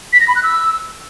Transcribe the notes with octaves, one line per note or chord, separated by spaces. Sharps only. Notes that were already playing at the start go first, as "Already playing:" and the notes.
B6
A#6
B5
F#6
E6